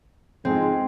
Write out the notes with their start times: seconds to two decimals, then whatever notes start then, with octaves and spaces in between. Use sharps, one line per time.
0.45 F2 G#2 G#3 C4